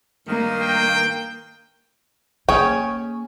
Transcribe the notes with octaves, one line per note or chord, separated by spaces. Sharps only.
G2 D#3 A#3
G5
A#3 C#4 G#4 C#5 G5